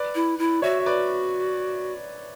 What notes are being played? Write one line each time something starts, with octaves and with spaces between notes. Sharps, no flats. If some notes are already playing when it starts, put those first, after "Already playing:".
Already playing: B4 D5
E4
E4
F#4 C#5 E5
E5
B4 D5